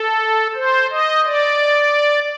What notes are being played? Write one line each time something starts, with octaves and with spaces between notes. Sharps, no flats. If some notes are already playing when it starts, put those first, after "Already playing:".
Already playing: A4
C5
D#5
D5